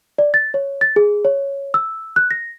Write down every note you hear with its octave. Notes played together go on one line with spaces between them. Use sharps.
D5
A6
C#5
A6
G#4
C#5
E6
F#6
A#6